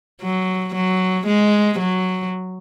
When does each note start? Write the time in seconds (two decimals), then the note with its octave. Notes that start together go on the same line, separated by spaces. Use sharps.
0.22 F#3
0.75 F#3
1.27 G#3
1.79 F#3